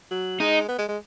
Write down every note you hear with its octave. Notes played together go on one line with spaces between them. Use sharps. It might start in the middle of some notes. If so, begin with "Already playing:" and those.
F#3
G#3 D#4
B3
G#3
G#3